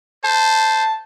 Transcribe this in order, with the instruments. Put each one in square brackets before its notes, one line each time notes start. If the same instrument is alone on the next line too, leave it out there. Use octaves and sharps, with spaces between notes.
[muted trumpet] C5 [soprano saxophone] A5